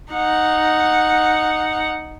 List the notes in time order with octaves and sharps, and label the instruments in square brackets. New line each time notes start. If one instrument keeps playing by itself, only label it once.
[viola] D#4 F#5